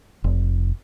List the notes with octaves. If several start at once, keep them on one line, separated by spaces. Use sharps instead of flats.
F1